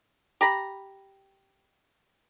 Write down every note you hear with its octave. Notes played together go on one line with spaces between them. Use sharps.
G4 A#5 B5